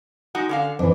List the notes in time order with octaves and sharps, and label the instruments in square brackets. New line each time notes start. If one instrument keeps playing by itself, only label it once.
[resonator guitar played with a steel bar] G#3 D#4 F#4
D3 C#4 F5
[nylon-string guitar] F2 E3 [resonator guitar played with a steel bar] D4